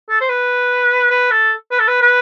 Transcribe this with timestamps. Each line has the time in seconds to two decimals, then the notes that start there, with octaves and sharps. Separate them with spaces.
0.10 A4
0.21 C5
0.29 B4
1.11 B4
1.31 A4
1.71 B4
1.80 A4
1.88 B4
2.02 B4